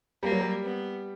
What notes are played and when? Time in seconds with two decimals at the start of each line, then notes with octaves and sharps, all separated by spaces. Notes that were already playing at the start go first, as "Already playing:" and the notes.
0.23 G3 A#3
0.31 F#3
0.40 G3
0.64 B3